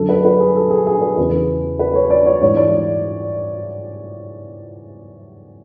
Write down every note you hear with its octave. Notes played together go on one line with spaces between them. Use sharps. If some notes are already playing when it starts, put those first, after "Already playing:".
Already playing: F#2 D3 A4
B4
B4
G#4
A4
G#4
G#4
B4
E2 C#3 E3 B4
B4
C#5
D5
C#5
G#2 E3 C#5
D5